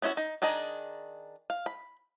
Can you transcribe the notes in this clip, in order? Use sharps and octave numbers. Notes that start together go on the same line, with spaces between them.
B3 C#4 E4 F#4 E5
D#4
D#3 D4 G#4 D#5 A#5
F5
B5